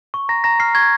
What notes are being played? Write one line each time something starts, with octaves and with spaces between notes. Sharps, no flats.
C#6
A#5 A#6
A#5 A#6
F6 C7
C#6 G#6